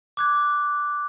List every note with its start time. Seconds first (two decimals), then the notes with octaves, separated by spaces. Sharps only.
0.17 D6 F#6 G#6